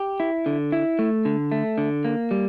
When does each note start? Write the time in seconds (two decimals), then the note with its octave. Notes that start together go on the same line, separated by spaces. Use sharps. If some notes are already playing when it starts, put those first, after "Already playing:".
Already playing: G4
0.20 E4
0.46 D3
0.72 E4
0.99 A3
1.25 D3
1.52 A3
1.78 D3
2.05 A#3
2.31 G3